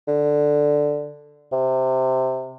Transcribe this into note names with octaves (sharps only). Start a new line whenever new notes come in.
D3
C3